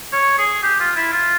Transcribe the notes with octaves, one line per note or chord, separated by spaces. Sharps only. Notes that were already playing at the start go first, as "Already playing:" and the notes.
C#5
G#4
G4
F4
E4
F4